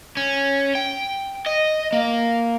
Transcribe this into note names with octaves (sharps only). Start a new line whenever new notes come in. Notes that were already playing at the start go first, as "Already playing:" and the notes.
C#4
G5
D#5
A#3